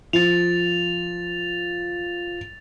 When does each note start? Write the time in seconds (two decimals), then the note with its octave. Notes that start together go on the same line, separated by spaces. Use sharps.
0.13 F3 A6 F7